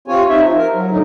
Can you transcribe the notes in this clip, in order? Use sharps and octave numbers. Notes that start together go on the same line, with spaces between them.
C3 C4 F4 C#5 G#5
D#4 E5
F3
A#4
F#3
A2 D3 F#3 D#4